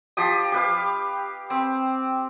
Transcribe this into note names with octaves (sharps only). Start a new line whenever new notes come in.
F3 G4 D#6
G4 B4 F5
C4